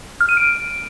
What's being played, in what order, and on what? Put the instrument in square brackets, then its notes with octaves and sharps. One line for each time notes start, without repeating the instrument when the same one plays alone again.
[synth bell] F6
D#7
D7